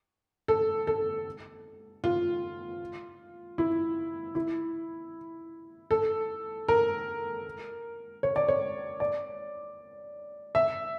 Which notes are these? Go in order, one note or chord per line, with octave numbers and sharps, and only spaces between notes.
A4
A4
F4
E4
E4
A4
A#4
C#5
D5
C#5
D5
E5